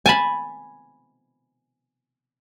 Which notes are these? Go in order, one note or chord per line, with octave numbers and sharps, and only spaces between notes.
G#5 A5 B5